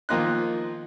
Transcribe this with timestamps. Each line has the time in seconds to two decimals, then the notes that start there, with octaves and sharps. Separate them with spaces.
0.09 D#3 F3 A#3 D#4 C6 F#6